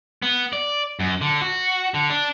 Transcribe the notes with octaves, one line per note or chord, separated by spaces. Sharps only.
B3
D5
F#2
D3
F#4
D3
D4